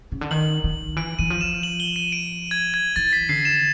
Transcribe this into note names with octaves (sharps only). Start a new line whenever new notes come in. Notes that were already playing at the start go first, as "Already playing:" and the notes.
C#3
D3
D#3 F#7
D#3
E3 D7
E3 D#7
F3
E7
F#7
G7
D#7
D7
G#6
G#6
E3 A6
B6
D3 C7
E7